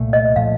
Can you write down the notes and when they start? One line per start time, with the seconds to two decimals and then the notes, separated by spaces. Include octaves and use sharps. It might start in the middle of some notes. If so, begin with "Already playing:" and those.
Already playing: C2 A#2 A3
0.13 D#5
0.36 A#2 F3 A3 F5